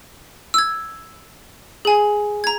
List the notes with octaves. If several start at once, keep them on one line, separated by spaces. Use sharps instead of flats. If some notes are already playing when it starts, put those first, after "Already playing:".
E6 G#6
G#4 G#5
A#5 G#6